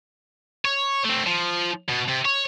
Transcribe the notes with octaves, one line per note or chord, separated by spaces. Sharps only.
C#5
A3 C4
F3
B2
C3
C#5